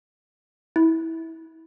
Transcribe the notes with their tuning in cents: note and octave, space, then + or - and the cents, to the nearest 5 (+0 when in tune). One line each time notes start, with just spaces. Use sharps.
E4 -20